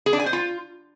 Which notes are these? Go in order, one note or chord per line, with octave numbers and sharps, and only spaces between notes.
G#4
D4
G#5
C5
F4